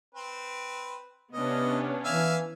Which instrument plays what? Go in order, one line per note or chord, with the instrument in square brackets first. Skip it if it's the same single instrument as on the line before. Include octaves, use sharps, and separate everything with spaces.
[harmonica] C4 B4
[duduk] C3 [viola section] B3 C#4 D4 [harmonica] D#5
[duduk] E3 [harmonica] E5 F5 G#5